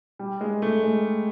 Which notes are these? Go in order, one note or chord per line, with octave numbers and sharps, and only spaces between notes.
G3
G#3
A3
G#3